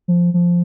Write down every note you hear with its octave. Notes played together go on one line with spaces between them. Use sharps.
F3
F3